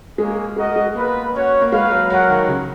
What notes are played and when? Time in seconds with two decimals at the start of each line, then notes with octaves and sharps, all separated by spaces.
0.18 G#3 A#3 C#4 G#4
0.56 G#3 F#4 A#4 D#5
0.76 G#3
0.95 A#3 B3 F4 B4
1.34 C#4 F#4 C#5 F#5
1.61 A#3
1.72 G#3 F#4 B4 F5
1.91 F#3
2.10 F#3 F4 A#4 C#5 F#5
2.29 D#3
2.48 C#3